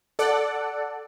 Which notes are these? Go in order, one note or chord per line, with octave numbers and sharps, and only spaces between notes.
A4 D5 F#5